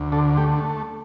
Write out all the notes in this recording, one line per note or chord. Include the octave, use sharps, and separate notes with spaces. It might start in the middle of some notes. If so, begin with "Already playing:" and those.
Already playing: D2
D3 A4
A3 G4